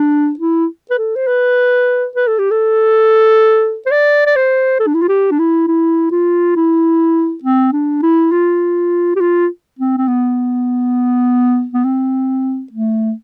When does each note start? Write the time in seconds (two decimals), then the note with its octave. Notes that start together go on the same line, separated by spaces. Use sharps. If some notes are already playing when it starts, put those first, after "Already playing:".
Already playing: D4
0.39 E4
0.91 B4
0.98 A4
1.16 C5
1.27 B4
2.16 B4
2.27 A4
2.39 G4
2.51 A4
3.86 C5
3.91 D5
4.26 D5
4.36 C5
4.80 A4
4.87 D4
4.94 E4
5.02 F4
5.09 G4
5.31 D4
5.39 E4
5.68 E4
6.11 F4
6.56 E4
7.44 C4
7.73 D4
8.03 E4
8.32 F4
9.16 G4
9.20 F4
9.79 C4
9.98 C4
10.08 B3
11.74 B3
11.85 C4
12.72 A3